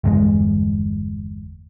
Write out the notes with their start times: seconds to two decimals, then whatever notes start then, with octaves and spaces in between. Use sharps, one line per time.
0.04 G1 E2 G#3